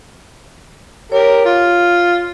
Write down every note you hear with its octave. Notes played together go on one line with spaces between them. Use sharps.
G4 A#4 C#5
F4